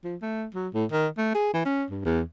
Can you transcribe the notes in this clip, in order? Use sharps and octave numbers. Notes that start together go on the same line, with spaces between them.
F3
A3
F#3
A2
D#3
A3
G#4
E3
C#4
G2
E2